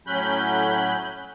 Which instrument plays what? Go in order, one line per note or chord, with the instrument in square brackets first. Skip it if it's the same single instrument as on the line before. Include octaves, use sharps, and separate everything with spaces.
[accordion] A2 F#3 C#4 B5 F#6 G6